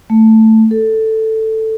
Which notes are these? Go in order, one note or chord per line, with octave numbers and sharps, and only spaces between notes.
A3
A4